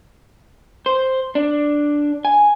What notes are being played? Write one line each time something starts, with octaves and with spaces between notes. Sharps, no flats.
C5
D4
G#5